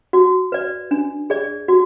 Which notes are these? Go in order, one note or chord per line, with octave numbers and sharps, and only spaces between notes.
F#4
B4 D5
D4
G#4 D5
F#4